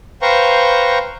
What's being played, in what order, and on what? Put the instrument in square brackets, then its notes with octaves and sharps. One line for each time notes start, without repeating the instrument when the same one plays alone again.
[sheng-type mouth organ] B4 C5 F5 G5 A#5 C#6